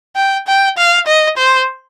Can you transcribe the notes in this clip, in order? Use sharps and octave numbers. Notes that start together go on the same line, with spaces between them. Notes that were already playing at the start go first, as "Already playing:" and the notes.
G5
G5
F5
D#5
C5